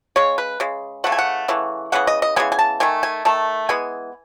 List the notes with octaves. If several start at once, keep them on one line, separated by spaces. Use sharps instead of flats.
C#3 G#3 C#5
B4
C#3 G#3
C#3 E3 A3 F#5
G#5
F#5
C#3 E3 A3
C#3 E3 B3 F#5
D#5
D#5
C#3 E3 G#3 B3 G#5
G#5
A5
D#3 A3 G#5
G#5
D#3 A3 A5
E3 G#3 B3 G#5